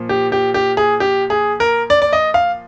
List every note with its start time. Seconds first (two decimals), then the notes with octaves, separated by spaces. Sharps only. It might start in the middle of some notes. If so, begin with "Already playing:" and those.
Already playing: A#2 F3
0.09 G4
0.32 G4
0.54 G4
0.77 G#4
1.00 G4
1.30 G#4
1.60 A#4
1.90 D5
2.02 D5
2.13 D#5
2.34 F5